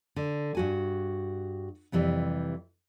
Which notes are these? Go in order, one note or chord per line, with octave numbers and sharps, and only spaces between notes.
D3
G2 F#4 G#5
F2 C3 E3 G3